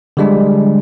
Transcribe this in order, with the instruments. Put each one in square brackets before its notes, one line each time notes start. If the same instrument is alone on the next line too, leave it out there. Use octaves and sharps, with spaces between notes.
[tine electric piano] D3 F3 G3 G#3 D4